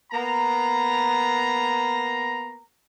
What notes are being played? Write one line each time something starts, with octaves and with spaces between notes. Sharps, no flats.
A#3 B3 A#5